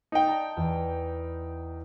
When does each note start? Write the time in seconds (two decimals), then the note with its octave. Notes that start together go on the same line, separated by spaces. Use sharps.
0.12 D#4 G5
0.25 D5 A5 A#5
0.57 E2